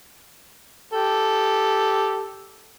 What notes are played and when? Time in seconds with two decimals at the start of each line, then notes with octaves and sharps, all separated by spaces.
0.93 G4 A4